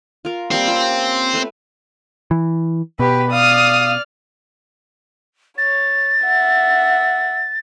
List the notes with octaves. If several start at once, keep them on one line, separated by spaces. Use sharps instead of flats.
F4 A#4
G3 A#3 C4 A#4
C#4 F4 G4
A3 B4
E3
B2 G4 B4
D5 F5 D#6 F6
C#5 A6
E5 F#5